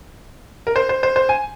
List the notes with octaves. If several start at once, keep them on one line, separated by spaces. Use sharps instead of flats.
A#4
C5
C5
C5
C5
G#5